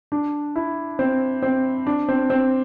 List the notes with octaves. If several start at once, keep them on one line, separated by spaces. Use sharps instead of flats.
D4
E4
C4
C4
D4
C4
C4